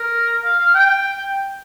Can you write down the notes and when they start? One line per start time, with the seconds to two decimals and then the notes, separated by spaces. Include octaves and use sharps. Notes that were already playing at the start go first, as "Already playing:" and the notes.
Already playing: A#4
0.45 F5
0.60 F5
0.74 G5